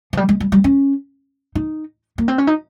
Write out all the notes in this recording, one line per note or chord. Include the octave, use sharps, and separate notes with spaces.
F3
G3
G#3
G3
G3
C#4
D#4
A#3
C4
C#4
D#4